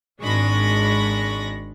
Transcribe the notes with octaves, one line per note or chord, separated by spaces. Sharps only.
G#1 G#3 D4 B5 C#6 A#6